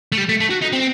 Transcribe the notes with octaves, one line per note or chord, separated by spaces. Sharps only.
A3
G3
A3
A3
F#4
D#4
C4